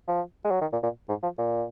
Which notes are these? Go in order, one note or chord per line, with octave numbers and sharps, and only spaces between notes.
F3
G#3
F#3
D#3
A#2
A#2
G#2
F3
A#2